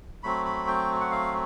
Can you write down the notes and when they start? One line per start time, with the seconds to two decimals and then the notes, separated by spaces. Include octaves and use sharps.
0.23 F#3 A3 C4 B5
0.45 B5
0.67 G5
1.01 F#5
1.11 F5